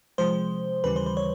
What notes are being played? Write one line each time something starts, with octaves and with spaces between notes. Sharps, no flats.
C3 F3 G#3 C5
D#2 C#3 E3 G3 B4
C5
C5
C#5